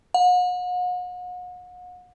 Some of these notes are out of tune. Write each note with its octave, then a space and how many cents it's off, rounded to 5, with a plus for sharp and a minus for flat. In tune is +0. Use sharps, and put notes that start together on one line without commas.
F#5 -40